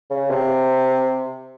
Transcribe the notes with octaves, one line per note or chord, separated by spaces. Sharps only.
C#3
C3